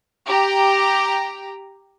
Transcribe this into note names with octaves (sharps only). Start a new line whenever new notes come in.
G4 A#5